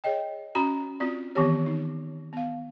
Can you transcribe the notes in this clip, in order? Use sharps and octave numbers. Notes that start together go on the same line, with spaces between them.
G#4 C#5 D#5 G5
C#4 F#4 A#5 B5
C4 F4 F#4 D5
D#3 E3 B3 C4 G4 C#5
D#4
B3 F5